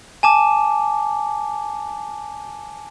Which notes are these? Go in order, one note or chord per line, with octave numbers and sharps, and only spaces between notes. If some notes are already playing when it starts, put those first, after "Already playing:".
G#5 A5 D6